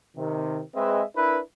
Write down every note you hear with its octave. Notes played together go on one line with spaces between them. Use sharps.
C3 D#3
G#3 C4 G#4 B4 D#5 E5
D4 E4 A#4 B4